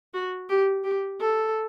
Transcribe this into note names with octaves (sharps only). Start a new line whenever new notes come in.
F#4
G4
G4
A4